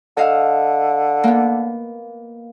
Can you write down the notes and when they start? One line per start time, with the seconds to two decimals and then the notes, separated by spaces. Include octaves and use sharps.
0.17 D3 A4 D#5 F5
1.24 A#3 B3